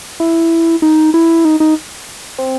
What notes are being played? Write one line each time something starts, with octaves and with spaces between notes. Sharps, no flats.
E4
D#4
E4
D#4
D#4
C4